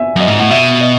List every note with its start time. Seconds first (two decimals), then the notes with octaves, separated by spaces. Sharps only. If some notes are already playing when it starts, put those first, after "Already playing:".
Already playing: E5 G#5
0.16 F#2 D#5
0.28 G#2
0.39 A2 F#5
0.50 B2 E5
0.81 D#5